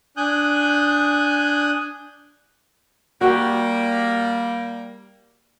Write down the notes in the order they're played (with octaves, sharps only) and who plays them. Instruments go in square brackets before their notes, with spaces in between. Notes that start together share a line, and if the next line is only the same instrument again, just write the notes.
[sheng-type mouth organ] D4 G#5 D#6 F#6 G6
[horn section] G3 A#3 [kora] F#4 G4